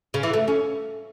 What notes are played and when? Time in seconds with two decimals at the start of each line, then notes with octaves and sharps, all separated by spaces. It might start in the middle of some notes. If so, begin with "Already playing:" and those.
0.14 C#3
0.23 E3
0.33 A3
0.48 C#4